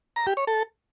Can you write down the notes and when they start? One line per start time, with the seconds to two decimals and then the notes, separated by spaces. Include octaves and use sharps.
0.16 A#5
0.27 G4
0.37 C#5
0.47 A4